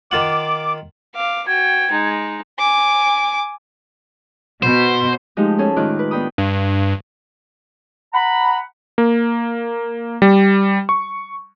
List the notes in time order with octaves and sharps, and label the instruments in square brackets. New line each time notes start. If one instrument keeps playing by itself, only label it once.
[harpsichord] D#3 F4 F#5 [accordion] D6
[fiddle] F5 D6
[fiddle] F#4 G5 [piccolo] G#6
[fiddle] G#3 D#4
[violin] G#5 D6
[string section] B2 [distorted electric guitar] C5
[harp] F3 G#3 A3 D#4 G4
C#4 G#4 A4
A2 D#3 G#3 F4 D6 F#6
B4
B3 D4 D#4 G5 B5 D#6
[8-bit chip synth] G2
[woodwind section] F#5 A#5 B5
[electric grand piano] A#3
G3
C#6